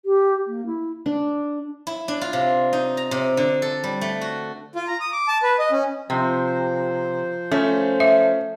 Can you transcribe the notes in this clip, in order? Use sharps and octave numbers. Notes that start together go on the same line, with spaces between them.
G4
A#3
E4
D4
E4
D4
F4
C3
D#4
A#5
C3
D3
A4
G3
A3
F#4
F4
A#5
D#6
D6
A5
B4
D#5
C#4
C3 F3 C5
A3 C#4
E5